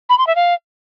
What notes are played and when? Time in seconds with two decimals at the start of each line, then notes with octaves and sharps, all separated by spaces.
0.09 B5
0.18 C6
0.27 E5
0.36 F5